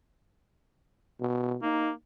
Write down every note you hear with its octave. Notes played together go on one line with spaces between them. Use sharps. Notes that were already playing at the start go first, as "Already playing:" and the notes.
B2
A#3 D#4